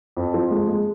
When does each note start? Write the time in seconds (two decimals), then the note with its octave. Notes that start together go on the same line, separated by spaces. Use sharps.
0.17 F2
0.34 F3
0.51 G#3
0.68 G#3